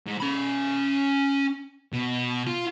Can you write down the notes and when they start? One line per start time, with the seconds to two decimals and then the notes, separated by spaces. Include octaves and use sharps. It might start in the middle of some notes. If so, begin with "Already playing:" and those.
0.06 G#2
0.20 C#4 B5
1.93 B2
2.47 F4